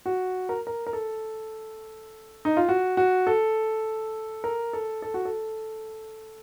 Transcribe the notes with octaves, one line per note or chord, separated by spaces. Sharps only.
F#4
A#4
A#4
A#4
A4
D#4
F4
F#4
F#4
A4
A#4
A4
A4
F#4
A4